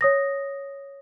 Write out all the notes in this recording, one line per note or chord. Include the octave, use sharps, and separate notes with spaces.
C#5 D#6 A#6